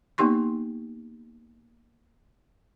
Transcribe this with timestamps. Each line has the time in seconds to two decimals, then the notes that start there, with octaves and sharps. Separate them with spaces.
0.18 A#3 B3 D#4 G4 C6 C#6